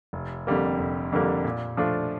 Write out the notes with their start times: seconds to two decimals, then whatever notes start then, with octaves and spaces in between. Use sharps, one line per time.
0.13 F1
0.47 F2 D3 G3 A#3
0.79 F1
1.12 F2 D3 G3 A#3
1.45 A#2
1.77 F3 A3 D4 F4